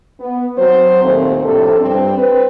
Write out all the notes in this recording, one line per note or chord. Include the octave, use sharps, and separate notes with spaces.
B3
F#3 C4 C5
D#2 A#2 A3 C4
F2 A2 C3 D4 A4
G2 C4
C4 B4